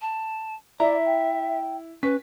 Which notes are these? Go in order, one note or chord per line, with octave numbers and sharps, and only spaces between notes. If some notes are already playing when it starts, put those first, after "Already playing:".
A5
E4 D5 E5 A#5
G5
C#4 B4 B6